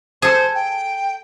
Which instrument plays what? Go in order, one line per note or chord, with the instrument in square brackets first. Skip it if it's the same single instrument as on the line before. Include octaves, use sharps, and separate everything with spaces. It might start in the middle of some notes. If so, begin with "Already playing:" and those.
[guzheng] G#4 A4 [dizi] C5
[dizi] G5